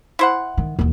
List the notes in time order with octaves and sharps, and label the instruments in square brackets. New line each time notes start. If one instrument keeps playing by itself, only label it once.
[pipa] E4 C5 F#5
[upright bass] D#3
D#2 E3